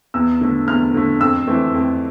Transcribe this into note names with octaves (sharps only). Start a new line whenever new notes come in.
E2 E6
D3 A3
E2 F6
D3 A3
F2 E6
E3 A3 C4
F2